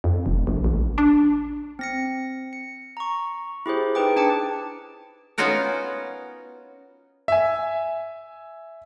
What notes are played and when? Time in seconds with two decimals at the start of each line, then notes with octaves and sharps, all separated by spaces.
0.04 F2
0.26 F1
0.47 A#1
0.64 A1
0.98 D4
1.79 C4 A#6 C#7
2.53 C#7
2.97 A#5 C#6
3.66 E4 G4 G#4 C5
3.95 D#4 G#4 B4 G5 D6
4.16 D4 G5 A5 D6 C#7
5.38 B3 C#4 D#4 F4 F#4 A#4
7.28 E5 G#5